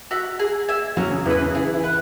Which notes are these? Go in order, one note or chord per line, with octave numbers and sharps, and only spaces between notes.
F#4 E5
G#4
E5 G#5
F#2 F#3 C#4
C#3
E2 E3 E4 B4
C#3
E3 E4 G#4
E3 E4
B4 F#5